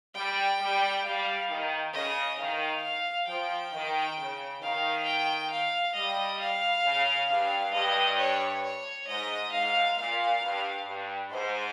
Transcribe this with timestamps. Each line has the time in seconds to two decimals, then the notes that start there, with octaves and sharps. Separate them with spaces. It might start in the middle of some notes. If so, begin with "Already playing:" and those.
0.15 G3 G5
0.60 G3
1.04 G3 F5
1.49 D#3
1.94 C#3 D#5
2.38 D#3 F5
2.83 F5
3.28 F3 G5
3.73 D#3
4.17 C#3
4.62 D#3 F5
5.06 G5
5.51 F5
5.95 G3 D#5
6.40 F5
6.85 C#3
7.29 G2 F5
7.74 G2 D#5
8.18 C#5
8.63 C#5
9.08 G#2 D#5
9.52 G#2 F5
9.97 A#2 F5
10.42 G2
10.86 G2
11.31 G#2 C5